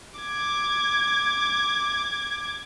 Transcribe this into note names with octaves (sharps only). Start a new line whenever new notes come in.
D6 G#6